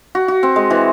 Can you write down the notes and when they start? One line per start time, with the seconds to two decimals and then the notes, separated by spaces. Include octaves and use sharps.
0.15 F#4
0.28 F#4
0.43 C4
0.56 G#3
0.70 E3